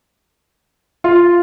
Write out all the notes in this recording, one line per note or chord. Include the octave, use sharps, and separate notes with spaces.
F4